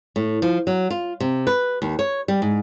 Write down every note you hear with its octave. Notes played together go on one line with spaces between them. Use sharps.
A2
F3
F#3
F4
C3
B4
D#2
C#5
G3
G#2